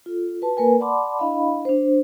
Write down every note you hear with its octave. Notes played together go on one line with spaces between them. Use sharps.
F4 A4
F#4 B4 A5
A#3 A#4 B4 G#5
D5 F#5 A5 B5 C6 D6
D4 E4 D#5 F5 B5
D4 C5